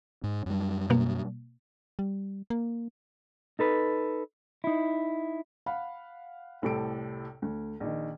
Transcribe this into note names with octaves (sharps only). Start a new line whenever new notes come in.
G#2
F#2 G3
B2 A#3
G3
A#3
D#4 A4 B4
D#4 E4
F5 F#5 B5
C2 A2 C3 A4 D7
D2
A#1 D#3